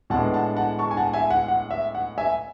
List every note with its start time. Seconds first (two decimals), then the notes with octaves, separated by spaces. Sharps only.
0.10 A2 G#3 B3 D4 F#5 A5
0.33 F#5 A5
0.56 F#5 A5
0.79 A5 C#6
0.91 G#5
0.97 F#5 A5
1.13 E5 G#5
1.30 F#5
1.48 F#5
1.71 E5
1.95 F#5
2.18 E5 G#5